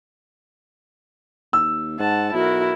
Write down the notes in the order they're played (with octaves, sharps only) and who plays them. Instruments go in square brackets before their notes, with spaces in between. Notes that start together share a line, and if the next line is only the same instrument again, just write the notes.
[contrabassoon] D#2 [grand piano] E6
[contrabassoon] G#2 [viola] F#5 A5
[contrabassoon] B1 [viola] E4 A#4 [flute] F#4